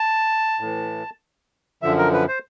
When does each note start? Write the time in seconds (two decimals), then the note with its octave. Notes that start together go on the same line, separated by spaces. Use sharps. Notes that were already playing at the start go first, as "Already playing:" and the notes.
Already playing: A5
0.60 A2 E3
1.82 F#2 D3 F3 E5
1.98 A#4
2.13 B4
2.28 C5